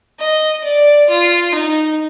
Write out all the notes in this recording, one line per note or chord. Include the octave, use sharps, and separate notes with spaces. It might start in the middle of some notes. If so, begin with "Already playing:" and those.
D#5
D5
F4
D#4